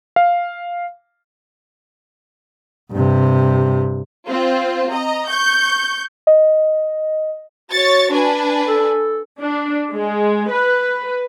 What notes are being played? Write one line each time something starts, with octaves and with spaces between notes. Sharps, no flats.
F5
G2 C3
C4 F4 C5
D#5 A#5
C#6 G6
D#5
F#4 C#5 C#6 A6
D4 B4 G#5
A4
D4
G#3
B4